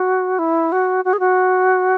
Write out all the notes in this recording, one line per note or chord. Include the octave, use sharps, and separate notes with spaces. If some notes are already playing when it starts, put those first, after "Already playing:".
Already playing: F#4
E4
F#4
F#4
G#4
F#4